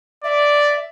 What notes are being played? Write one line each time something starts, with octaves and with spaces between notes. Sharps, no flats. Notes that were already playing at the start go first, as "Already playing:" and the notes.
D5 E5